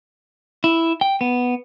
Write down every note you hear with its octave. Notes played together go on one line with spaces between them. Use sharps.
E4
G5
B3